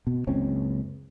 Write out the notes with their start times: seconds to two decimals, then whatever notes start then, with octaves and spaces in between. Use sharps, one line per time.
0.07 B2
0.27 F#1 C#2 C4 C#4